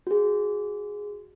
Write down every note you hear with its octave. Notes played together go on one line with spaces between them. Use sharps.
F#4 G#4